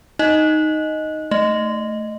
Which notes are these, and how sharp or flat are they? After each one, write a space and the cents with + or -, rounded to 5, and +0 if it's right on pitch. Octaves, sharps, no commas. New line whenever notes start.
D#4 +0 D#5 +0
A3 +0 D#5 +0